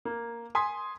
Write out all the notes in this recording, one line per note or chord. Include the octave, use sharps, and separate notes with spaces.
A#3
G#5 C6 D#6 B6